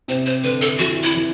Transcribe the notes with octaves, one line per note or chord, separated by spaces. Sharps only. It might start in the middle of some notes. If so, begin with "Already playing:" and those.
C3 C5
C5
D3 B4
A4
E3 F#4
E4
E3